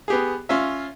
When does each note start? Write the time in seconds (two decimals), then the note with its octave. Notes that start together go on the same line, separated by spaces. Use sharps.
0.08 B3 G4 G#4
0.49 C#4 F4 E5